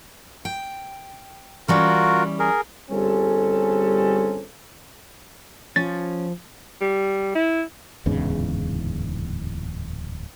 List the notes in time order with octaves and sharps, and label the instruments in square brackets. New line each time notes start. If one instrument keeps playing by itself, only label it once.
[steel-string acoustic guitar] G5
[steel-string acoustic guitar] E3 G3 C#4 [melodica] F4 F#4 A#4
[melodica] G#4 A#4
[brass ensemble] G1 G3 C4 C#4 G#4 A4
[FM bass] F3 [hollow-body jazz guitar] C#4 [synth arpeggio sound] A6
[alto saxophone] G3
E4
[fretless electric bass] D1 E2 G#2 C#3